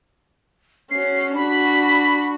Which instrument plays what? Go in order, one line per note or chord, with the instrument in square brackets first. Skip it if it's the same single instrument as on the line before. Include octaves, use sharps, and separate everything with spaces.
[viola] C#4 F#4 [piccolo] C7
[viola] D4 F#4 [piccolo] B5